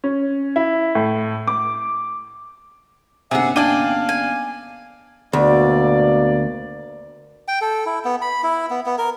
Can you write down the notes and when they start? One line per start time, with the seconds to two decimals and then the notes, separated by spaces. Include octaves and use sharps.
0.04 C#4
0.56 E4
0.95 A2
1.47 D6
3.31 G1 C3 A#3 C#4 G#4 E5 F#5
3.56 D4 F5 G5 G#5 D6 D#7
4.09 G#5
5.33 D2 B2 A#3 D5
7.48 G5
7.61 A4
7.86 E4
8.05 B3
8.22 B5
8.43 E4
8.70 B3
8.86 B3
8.98 A#4